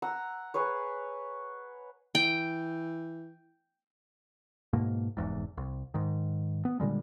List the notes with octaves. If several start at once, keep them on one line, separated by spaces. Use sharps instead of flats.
F#5 A#5 E6
G#4 B4 C#5
E3 G5
G#2 B2 A#3
F1 E2 G#2
C2
G#2 D#3
B3
A#2 D3 G3 G#3